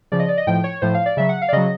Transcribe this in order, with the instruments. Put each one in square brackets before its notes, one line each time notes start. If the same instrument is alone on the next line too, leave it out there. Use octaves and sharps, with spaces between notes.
[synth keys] C#3 F3 D5
D#5
D5
D#5
A2 F3 G5
C#5
A2 F3 C5
F5
D5
C#3 F#3 E5
F#5
F5
D5
C#3 F#3 D#5